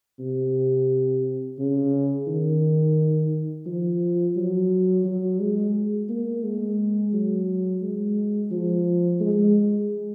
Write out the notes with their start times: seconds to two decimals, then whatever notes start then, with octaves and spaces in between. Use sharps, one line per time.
0.20 C3
1.59 C#3
2.28 D#3
3.66 F3
4.37 F#3
5.05 F#3
5.40 G#3
6.09 A#3
6.44 G#3
7.13 F#3
7.82 G#3
8.51 F3
9.21 G#3